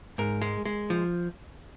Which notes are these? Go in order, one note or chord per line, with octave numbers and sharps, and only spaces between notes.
G#2 A#4
G#3
G#3
F3